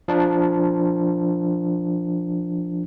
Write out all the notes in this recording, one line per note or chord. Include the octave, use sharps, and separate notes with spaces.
F3 D4